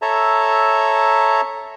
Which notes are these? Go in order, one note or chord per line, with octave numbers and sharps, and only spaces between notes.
A4 C#5 E5 A5 A#5